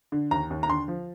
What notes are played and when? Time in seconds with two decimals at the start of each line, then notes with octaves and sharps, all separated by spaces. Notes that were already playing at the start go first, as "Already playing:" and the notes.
0.12 D3
0.31 D#2 A#5
0.50 D#2
0.63 A#5
0.68 D3 C6
0.88 F3